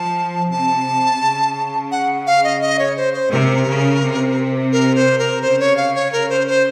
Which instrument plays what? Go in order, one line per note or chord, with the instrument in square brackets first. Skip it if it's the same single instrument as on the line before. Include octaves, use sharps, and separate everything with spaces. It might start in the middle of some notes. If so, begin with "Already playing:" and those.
Already playing: [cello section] F3 [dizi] A5
[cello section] C3 [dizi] A5
[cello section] C#3
[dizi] F#5
F5
D#5
D#5
C#5
C5
C5
[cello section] C3 [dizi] A#4
[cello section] C#3
C3
[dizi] A#4
C5
A#4
[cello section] C#3 [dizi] C5
[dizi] C#5
F5
C#5
A#4
C5
C5